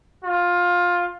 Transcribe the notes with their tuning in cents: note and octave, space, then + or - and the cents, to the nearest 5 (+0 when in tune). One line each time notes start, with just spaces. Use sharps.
F4 +15